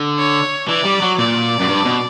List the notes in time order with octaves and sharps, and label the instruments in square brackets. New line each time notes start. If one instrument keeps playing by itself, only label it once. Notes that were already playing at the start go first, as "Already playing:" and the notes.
Already playing: [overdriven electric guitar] D3
[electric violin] C#5
[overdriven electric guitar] E3 [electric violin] D5
[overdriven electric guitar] G3
F#3
[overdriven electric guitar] A#2 [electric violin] D5
[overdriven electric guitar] F#2
G2
B2